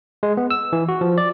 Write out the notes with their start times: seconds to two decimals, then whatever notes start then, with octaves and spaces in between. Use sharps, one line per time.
0.23 G#3
0.37 B3
0.51 E6
0.73 E3
0.89 F#4
1.01 F3
1.18 D5